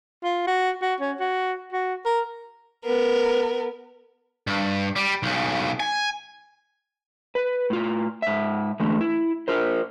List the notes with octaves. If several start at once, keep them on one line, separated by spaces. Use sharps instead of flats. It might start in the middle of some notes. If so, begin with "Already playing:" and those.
F4
F#4
F#4
C#4
F#4
F#4
A#4
B3 A#4
G2
G3
B1 C#3
G#5
B4
A2 F4
G#2 E5
D3 E3 G#3 A3
E4
F4 A#4 C5